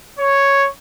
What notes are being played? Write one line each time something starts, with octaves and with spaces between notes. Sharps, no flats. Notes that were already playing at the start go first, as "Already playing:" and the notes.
C#5